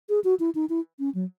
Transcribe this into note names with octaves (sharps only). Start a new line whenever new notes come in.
G#4
F#4
E4
D#4
E4
C#4
F#3